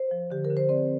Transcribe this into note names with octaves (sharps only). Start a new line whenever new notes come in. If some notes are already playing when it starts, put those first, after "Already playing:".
Already playing: C5
F3
D3 G4
A#4
D3
C5
C4 D5